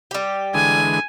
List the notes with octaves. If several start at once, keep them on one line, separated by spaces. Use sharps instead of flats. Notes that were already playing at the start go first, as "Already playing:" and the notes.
G3 G4
D3 E3 G#3 G#5